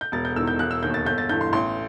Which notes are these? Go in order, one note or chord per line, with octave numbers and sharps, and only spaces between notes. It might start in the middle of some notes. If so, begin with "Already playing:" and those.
G6
E1 A6
G6
E2 D#3 E6
G6
E1 F#6
E6
D#2 D#3 G6
A6
G1 G6
A6
G2 E3 G6
C6
A1 C6